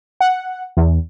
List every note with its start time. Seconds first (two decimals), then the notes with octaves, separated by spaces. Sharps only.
0.21 F#5
0.77 E2